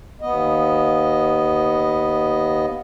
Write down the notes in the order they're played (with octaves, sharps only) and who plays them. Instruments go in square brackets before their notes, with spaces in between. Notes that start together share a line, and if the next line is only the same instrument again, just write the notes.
[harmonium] D#2 B3 D#5